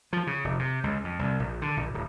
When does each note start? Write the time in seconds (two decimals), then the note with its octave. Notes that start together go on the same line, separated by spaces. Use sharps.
0.13 F3
0.27 C#3
0.44 F1
0.59 C3
0.83 C#2
1.04 F2
1.19 C2
1.39 A#1
1.62 D3
1.77 A#1
1.94 D1